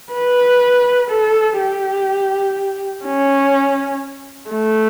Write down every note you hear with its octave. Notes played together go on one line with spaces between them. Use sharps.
B4
A4
G4
C#4
A3